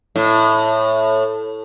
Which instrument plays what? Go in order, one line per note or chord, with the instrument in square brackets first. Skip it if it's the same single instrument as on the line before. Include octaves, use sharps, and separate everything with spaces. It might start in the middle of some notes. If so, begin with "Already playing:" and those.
[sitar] A2